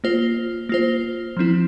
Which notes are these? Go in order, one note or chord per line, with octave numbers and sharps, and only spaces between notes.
A#3 F4 C5
A#3 F4 C5
F3 C4 E4